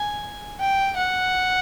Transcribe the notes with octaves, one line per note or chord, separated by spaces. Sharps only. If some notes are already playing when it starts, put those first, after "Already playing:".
Already playing: G#5
G5
F#5